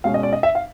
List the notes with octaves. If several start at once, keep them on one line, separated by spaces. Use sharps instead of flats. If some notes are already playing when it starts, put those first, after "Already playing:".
B2 G#3 C#4 F5
D#5
D5
D#5
E5
F5